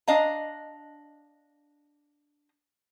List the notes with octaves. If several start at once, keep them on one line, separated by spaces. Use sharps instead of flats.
D4 D#5 F5 A#5